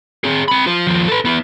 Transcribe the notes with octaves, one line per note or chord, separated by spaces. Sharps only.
C4 G#4
C4 B5
F4 C5
D#2 F3
A4 B4
B3 E4